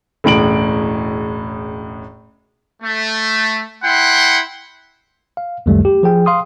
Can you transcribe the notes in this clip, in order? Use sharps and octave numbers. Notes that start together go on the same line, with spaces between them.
E1 C#2 A2 D7 F#7
A3
E4 F#5 G5 C6
F5
C#2 F#2 D#3 G3 A3
G4
F3 G#4 G5
F5 C6 D#6